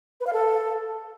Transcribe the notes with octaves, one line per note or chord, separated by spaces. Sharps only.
B4
F5
A4